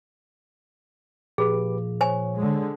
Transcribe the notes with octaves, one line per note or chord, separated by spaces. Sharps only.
A#2 F3 G4 G#4 B4 D6
C5 C#5 G#5
D3 G#3